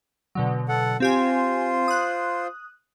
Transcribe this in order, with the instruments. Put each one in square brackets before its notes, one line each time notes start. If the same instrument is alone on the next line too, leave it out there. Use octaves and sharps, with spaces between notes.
[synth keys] B2 D3 F#3
[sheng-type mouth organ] A4 F#5
[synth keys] C4 G4 G#5 [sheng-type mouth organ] F4 C5
[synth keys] D#6 F#6